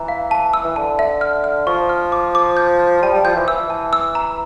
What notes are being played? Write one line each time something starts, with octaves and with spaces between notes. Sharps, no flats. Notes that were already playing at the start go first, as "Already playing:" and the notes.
Already playing: E3 A#5
F5
A5
E6
E3
D3 A5
E5
F6
F6
F3 C#6
F6
D6
D6
G6
G6
G3 A5
G3
F3 G6
E3
E3 E6
A5
E6
A#5